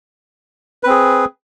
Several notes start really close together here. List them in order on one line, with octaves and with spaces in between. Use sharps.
B4 C4 G#4